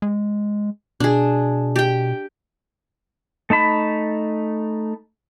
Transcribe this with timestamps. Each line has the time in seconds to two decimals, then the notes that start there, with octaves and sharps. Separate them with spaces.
0.02 G#3
1.00 B2 D4 G#4
1.76 G4 G5
3.50 A3 D#4 A5 B5